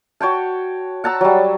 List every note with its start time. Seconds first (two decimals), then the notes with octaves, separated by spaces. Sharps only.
0.20 F#4 C#5 G5 A5
1.04 F#5 A5 A#5 E6
1.21 F#3 G3